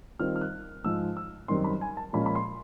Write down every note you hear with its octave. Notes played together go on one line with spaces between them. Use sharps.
D#3 G3 C4 F4 F6
F6
F#6
G#2 F3 G#3 E6
E6
F#2 D#3 G3 C4 C6
B5
G#5
A5
A#2 F3 G#3 C#4 F4 B5
B5
C6